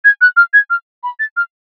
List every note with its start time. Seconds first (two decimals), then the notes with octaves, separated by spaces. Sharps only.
0.05 G#6
0.21 F#6
0.37 F6
0.53 G#6
0.70 F6
1.03 B5
1.20 A6
1.37 F6